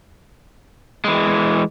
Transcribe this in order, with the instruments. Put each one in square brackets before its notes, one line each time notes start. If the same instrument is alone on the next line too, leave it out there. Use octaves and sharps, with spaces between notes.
[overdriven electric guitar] E3 G#3